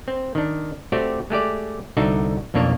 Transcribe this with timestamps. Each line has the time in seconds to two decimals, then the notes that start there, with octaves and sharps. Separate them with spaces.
0.08 C4
0.35 D#3 D4
0.92 A3 C4 F#4 G4 D5
1.30 G#3 A3 G4 D5
1.97 C2 D3 D4 D#4 F#4 E5
2.54 B1 F2 A#3 D4 C#5